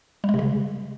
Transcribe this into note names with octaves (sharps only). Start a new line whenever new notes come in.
G3
G#3
C3
C#3